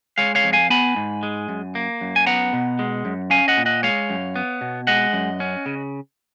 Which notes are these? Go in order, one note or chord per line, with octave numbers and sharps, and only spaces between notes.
G#3 C#5 F5
C#5 F5
F2
F5 G#5
B3 G#5 B5
G#2
G#3
F#2
A#3
F#2
G#5
B3 F#5 A#5
B2
G#3
F#2
C#4 F5 G#5
D#5 F#5
A#2
D#5 F#5
G#3 C#5 F5
F#2
B3
B2
G#3 D#5 F#5
F#2
C#4
C#3